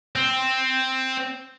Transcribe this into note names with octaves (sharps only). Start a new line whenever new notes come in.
C4